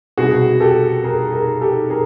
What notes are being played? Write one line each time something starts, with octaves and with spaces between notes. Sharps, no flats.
C2 B2 F#4 G#4
G4 A4
G#4 A#4
G#4 A#4
G4 A4
G#4 A#4